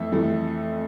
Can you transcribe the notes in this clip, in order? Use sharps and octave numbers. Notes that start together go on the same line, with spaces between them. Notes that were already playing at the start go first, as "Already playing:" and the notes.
Already playing: F2 E3 A3 E5
F2 E3 A3